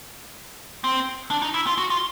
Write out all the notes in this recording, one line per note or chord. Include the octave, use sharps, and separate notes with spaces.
C4
D4
D#4
E4
F4
F#4
F4